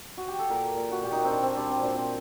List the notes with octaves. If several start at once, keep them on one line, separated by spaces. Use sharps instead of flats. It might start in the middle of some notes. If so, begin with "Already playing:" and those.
F#4
G4
A4
A#2 A#4
A#2
F#4
A#2 G4
D#4 F#4
C4
A#2 D4
C4
G3 D4
C4
A#2 D4
C4